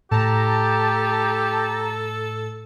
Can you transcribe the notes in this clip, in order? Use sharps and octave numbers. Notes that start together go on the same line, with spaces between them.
A2 G4 A4 A5 A#5